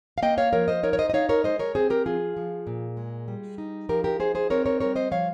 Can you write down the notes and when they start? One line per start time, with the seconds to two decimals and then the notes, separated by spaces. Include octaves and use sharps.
0.18 F5
0.22 A#3 D#5 G5
0.38 C#5 F5
0.53 F3 A#4 C#5
0.68 C5 D#5
0.83 D#4 A#4 C#5
0.93 C#5
0.99 C5 D#5
1.10 D#5
1.14 D#4 C#5 F5
1.29 A#4 C#5
1.44 G#3 C5 D#5
1.59 A#4 C#5
1.75 C4 G#4 C5
1.90 G4 A#4
2.05 F3 F4 G#4
2.37 F3
2.67 A#2
2.97 G#3
3.28 G3
3.58 D#4
3.89 F3 G4 A#4
4.04 G4 A#4
4.19 D#4 G#4 C5
4.35 G#4 C5
4.50 C4 A#4 C#5
4.65 A#4 C#5
4.80 G3 A#4 C#5
4.96 C5 D#5
5.11 F3 C#5 F5